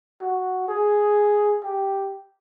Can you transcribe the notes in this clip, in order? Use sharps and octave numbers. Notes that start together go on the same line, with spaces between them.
F#4
G#4
G4